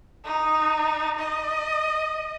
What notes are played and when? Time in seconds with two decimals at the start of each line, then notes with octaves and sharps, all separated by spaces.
0.25 D#4
1.19 D#5